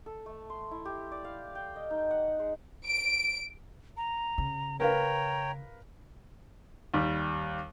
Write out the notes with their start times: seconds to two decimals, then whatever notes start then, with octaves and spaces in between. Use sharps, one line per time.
0.06 A4
0.26 A3
0.50 C6
0.71 E4
0.85 G4
1.12 D5
1.24 F5
1.55 G5
1.76 D#5
1.91 D#4
2.11 F#5
2.39 G#3
2.86 D7
3.97 A#5
4.38 C#3
4.80 A#4 B4 C#5 F5 G5 A#5
6.94 D#2 G3